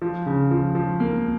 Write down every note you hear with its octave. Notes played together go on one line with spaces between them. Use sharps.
F3
C#3
F3
F3
A#3